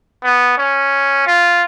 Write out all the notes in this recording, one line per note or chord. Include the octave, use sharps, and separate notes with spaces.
B3
C#4
F4